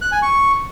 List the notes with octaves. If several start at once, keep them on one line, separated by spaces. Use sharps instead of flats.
F#6
G#5
C#6